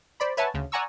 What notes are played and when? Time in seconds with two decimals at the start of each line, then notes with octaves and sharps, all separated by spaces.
0.20 C5 D5 B5
0.37 B4 C#5 E5 F#5 G#5 A5
0.54 D2 C#3
0.72 D5 F#5 G#5 A#5 C#6 E6